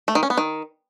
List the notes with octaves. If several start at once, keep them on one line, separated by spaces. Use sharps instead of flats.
A3
D#3
C#4
B3
D#3